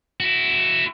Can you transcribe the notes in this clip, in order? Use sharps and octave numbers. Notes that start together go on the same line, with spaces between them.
E4 F#4